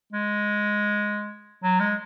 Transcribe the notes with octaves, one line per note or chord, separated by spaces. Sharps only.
G#3
F#3
G#3